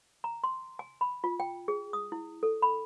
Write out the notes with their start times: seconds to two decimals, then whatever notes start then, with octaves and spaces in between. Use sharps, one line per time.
0.24 A#5
0.44 C6
0.79 G#5
1.01 B5
1.24 F4
1.40 G5
1.68 G#4
1.93 D#6
2.12 E4
2.43 A4
2.62 B5